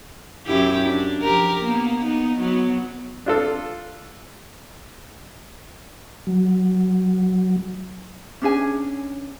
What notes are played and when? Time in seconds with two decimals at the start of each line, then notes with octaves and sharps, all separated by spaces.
0.46 F#2 E4 G4
0.89 D4
1.22 F3 G4 A#4
1.60 A#3 B3
2.05 B3 D#4
2.39 F#3 B3
3.26 D4 F4 A4
6.27 F#3
8.42 C#4 D4 G#4 G#5